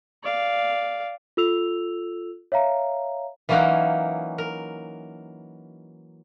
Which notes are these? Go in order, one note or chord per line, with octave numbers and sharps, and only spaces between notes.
D5 F5
F4 A4 E6 F7
C#5 E5 F5 A#5
E3 F#3 A#3 C#4 D#4 F#4
A#4